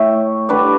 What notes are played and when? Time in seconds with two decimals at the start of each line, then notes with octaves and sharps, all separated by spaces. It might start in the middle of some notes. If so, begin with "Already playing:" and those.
Already playing: A2 A3 C#5 E5 G5
0.49 D3 G3 D4 B4 D5